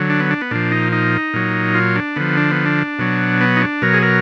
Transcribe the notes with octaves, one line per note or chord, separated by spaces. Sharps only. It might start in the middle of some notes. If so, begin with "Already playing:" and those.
Already playing: D3 F#3
D4
B3
D4
B3
A#2 F3 D4
D#4
D#4
A#2 F#3
F4
D4
D3 F3 B3
D4
B3
D4
B2 F#3
B3
D#4
D4
B2 F#3 A#4
G#4
A#4